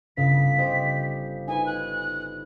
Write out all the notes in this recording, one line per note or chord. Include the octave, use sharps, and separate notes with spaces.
G1 C#3 F5 B6
G4 C5 D#5
D#4 B4 G#5
F#6